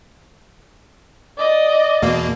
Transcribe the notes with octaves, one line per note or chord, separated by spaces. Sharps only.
D5 D#5
E2 B2 A#3